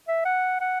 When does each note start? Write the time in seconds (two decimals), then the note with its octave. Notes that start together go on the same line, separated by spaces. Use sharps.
0.08 E5
0.25 F#5
0.61 F#5